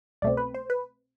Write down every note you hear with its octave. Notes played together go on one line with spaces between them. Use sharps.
C2 B2 A3 C4 D5
B4
C5
B4